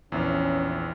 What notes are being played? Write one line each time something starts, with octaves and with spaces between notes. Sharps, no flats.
A#1 E2 C#4